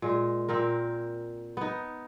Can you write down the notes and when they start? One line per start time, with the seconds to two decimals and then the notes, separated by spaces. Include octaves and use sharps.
0.02 A#2 G#3
0.49 A#2 C4 A#4
1.57 B3 D#4